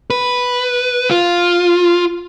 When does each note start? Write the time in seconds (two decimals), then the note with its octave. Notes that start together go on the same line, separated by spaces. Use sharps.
0.10 B4
1.11 F4